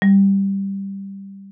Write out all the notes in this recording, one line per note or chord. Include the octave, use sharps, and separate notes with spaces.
G3